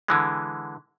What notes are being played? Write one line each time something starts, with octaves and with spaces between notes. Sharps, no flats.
D3 E3 G#3